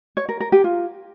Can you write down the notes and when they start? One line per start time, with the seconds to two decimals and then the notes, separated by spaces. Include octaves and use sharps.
0.17 C#5
0.29 A#4
0.40 A#4
0.52 G4
0.64 F4